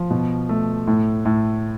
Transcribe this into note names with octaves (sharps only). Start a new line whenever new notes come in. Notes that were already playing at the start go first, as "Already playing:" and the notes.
Already playing: F3
B2
A3
A2
A2